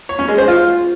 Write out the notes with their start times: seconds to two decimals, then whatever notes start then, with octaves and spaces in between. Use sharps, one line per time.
0.09 C#5
0.19 C#4
0.28 G#3
0.38 C5
0.48 F4